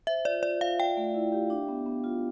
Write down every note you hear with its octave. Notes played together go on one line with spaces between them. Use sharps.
C5 E5
F4 D5
F4 D5
F4 F5
D5 G5
A3
E4
G4
D4
B3
B3
F4